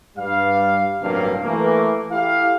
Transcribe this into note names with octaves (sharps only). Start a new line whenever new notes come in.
G2 G3 F5
A1 G2 C3 F#3 A#3 F5
E3 A3 A#3
E4 G4 A4 F5